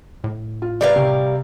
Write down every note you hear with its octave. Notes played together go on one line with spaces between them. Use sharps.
A2
F4
G3 A#4 B4 D5 F5
C3